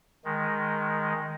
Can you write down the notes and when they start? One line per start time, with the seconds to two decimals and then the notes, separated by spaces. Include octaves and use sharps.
0.25 D#3 G#3